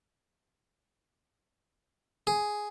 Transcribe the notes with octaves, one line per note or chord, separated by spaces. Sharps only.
G#4